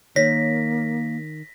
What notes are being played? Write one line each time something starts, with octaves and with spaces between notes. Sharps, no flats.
D#3 A#3 C#5 A#6 B6